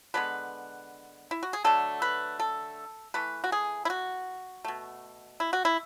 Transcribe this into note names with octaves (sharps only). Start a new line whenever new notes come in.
D3 G#3 B3 B4
E4
F#4
G#4
D3 F#3 A3 A4
B4
A4
E3 A3 B4
F#4
G#4
E4
F#4
B2 A3
E4
F#4
E4